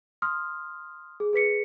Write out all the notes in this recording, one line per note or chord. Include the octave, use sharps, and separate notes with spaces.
C6 D#6 F6
G#4
G#4 B4 B6 C#7